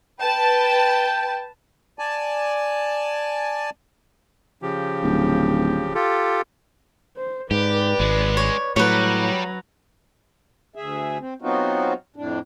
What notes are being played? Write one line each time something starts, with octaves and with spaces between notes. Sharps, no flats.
B4 G5 A5
D5 G#5 A5
C#3 F3 G4
D1
F4 G4 A4
C5
G#2 G4 B4 D5
G#1 G#3 C#4
C#5
A2 F#3 G3 B4 C#5 A#5
D2 G#4 E5
C4
F#3 B3 C4 D#4 F4 F#4
F2 A2 D4